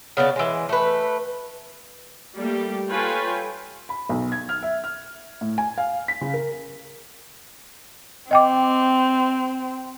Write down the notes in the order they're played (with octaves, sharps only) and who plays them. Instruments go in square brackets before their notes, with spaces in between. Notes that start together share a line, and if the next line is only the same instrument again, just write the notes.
[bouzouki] C#3 B3 F#4 D5
E3 G#3
A3 B4
[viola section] G3 A3 A#3 G4
F4 A4 B4 C#5 G5 G#5
[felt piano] B5
B1
G#6
F6
E5
F6
A2
G#5
F5
B6
C#3
A#4
[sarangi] C4 [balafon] D#5 G5 D6